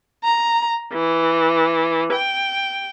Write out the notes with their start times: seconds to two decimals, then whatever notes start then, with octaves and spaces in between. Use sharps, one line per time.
0.24 A#5
0.93 E3
2.14 G5